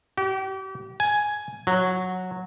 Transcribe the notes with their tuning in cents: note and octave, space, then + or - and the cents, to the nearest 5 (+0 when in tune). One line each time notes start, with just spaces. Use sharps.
G4 -35
G#5 +10
F#3 -10